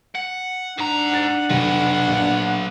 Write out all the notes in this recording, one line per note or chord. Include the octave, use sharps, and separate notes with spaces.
F#5
G#2 D4 F#5 A#5
A6
F1 F#3 B3
A#1